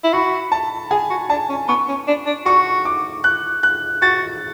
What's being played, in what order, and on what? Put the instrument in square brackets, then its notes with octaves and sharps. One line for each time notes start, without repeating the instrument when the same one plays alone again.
[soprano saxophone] E4
[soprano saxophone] F#4 [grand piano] B5
[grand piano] A5
[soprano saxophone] G#4 [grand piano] G#5
[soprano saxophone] F#4
[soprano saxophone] D4 [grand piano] A5
[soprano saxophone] C#4
[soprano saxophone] B3 [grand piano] C#6
[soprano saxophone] C#4
D4
D4
[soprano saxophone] F#4 [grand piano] C#6
[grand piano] D6
F#6
F#6
[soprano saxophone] F#4 [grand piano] A6